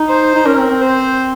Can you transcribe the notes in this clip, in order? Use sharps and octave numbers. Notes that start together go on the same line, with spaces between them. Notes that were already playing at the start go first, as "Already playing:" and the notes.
Already playing: D#4
C5
D#4
C#4 A#4
C4
C4
C5